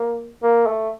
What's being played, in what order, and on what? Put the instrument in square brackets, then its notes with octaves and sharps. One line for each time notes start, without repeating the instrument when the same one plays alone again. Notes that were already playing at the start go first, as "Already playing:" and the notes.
Already playing: [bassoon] A#3
A#3
A3